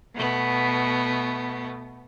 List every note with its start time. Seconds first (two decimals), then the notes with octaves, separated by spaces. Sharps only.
0.15 B2 A3 B3